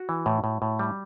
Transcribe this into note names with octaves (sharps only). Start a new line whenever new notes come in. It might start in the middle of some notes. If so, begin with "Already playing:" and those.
Already playing: F#4
E3
A2
A2
A2
G3